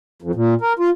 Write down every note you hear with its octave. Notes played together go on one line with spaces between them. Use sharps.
F2
A#2
A#4
F4